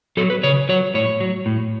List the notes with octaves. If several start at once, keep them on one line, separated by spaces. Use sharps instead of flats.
F#3 A4
B4
C#3 C#5
F#3 C#5
A2 C#5
F#3
A2